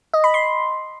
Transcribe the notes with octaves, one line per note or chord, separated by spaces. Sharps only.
D#5
B5
C6